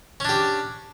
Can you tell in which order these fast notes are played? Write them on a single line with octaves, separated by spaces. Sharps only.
C#4 D4 G4